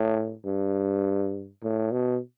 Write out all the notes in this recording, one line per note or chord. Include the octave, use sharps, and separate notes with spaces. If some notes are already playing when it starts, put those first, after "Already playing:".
Already playing: A2
G2
A2
B2